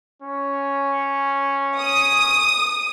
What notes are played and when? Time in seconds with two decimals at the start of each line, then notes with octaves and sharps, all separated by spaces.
0.22 C#4
1.79 D#6